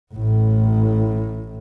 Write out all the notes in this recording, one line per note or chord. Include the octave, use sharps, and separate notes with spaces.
A1 A2